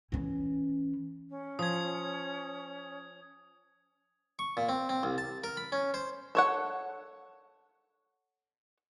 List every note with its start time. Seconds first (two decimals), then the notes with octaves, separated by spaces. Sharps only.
0.12 E3 C#4
1.29 C#4
1.59 F3 D#6 G#6
4.39 C#6
4.57 A#2
4.69 C4
4.89 C4
5.03 C2
5.18 A5
5.44 A#4
5.57 B5
5.72 C#4
5.94 C5
6.35 A4 C#5 F#5